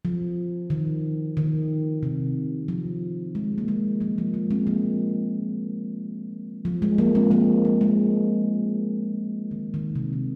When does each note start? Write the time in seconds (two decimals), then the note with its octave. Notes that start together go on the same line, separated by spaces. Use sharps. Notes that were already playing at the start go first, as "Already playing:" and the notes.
0.05 F3
0.70 D#3
1.37 D#3
2.03 C3
2.68 F3
3.35 G#3
3.58 A#3
3.68 G#3
4.00 F3 A#3
4.18 F3
4.34 G#3
4.51 G#3 C4
4.67 F3 A#3
6.65 F3
6.82 G#3
6.98 F3 A#3
7.15 G#3 C4
7.31 F3 A#3
7.65 F3
7.81 G#3
9.51 D#3
9.74 D#3
9.95 C3
10.13 D#3